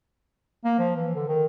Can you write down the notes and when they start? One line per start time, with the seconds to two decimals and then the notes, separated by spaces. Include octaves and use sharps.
0.64 A#3
0.79 F3
0.96 E3
1.15 D3
1.28 D#3